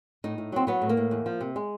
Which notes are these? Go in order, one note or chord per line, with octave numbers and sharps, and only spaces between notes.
A2 D#4
A2
F#3 C4
F#3 B3
A2
A#3
A2
E2
F3
C3
G#3